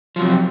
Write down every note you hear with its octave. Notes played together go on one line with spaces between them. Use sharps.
C3 F3 F#3